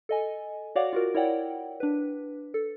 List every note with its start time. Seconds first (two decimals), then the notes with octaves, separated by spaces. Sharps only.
0.09 A4 D#5 G#5
0.76 F#4 C#5 D5 F5 F#5 D6
0.93 F4 F#4 A#4
1.14 E4 A#4 C#5 D5 F#5 G5
1.80 D4 B4
2.54 A4